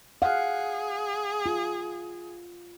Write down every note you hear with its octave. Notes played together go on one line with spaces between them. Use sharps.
G#4 F5 F#5
F4